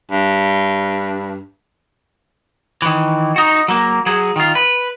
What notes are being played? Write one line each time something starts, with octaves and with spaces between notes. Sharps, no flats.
G2
D#3 E3
D#4 F#4
F#3 A#3
F#3 G#4
D#3 F4
B4